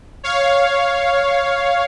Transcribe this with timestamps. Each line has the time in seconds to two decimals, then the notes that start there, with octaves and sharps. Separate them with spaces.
0.24 C#5 F5